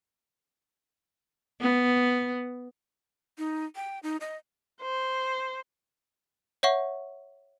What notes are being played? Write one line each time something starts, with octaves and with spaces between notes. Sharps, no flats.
B3
D#4
G5
D#4
D#5
C5
C#5 E5 F#5 C#6